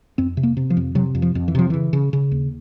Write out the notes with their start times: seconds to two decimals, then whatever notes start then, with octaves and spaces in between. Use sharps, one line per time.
0.18 F2 C4
0.37 C3
0.43 A#3
0.57 C3
0.70 F3
0.77 F2
0.95 C3 F#3
1.15 F2
1.22 F3
1.35 F2
1.48 E3
1.55 C3 F3
1.70 C#3 E3
1.93 C#3
2.13 C#3
2.31 D#2